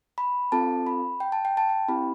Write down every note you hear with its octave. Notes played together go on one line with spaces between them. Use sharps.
B5
C4 F4 A4 A5
B5
G5
A5
G5
A5
G5
C4 E4 G4 B5